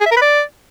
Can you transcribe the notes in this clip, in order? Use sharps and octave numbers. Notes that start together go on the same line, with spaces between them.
G#4
E5
A#4
B4
D5